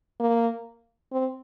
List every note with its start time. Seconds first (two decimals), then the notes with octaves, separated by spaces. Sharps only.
0.20 A#3
1.12 C4